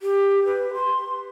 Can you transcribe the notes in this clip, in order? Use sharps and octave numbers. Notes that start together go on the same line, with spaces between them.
G4
B4
C6